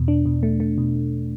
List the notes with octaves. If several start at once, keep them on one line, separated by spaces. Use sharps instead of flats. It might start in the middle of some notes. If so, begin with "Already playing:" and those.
Already playing: E2 B2
D4
B2
A3
A3
B2